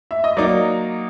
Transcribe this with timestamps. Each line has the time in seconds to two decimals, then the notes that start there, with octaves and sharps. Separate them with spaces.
0.11 E5
0.24 D#5
0.37 F#3 A#3 D#4 D5